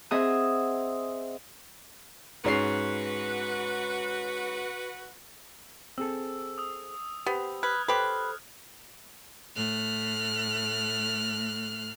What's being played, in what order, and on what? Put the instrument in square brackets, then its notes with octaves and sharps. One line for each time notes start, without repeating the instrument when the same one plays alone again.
[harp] C4 G#4 D#5 E5 F#5 D#6
[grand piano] G#2 C#4 C7 [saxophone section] F#4 B4
[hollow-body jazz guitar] C4 G#4 A4 [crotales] E6
[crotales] D#6 E6
[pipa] B3 [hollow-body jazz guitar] G4 C5 [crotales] D#6
[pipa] B4 [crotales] F6 F#6 G#6
[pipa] G4 B4 [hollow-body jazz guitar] A4 C5
[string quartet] A2 A3 F6 F#6